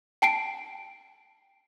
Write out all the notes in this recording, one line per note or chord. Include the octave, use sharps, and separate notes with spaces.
G5 A5 C7 D7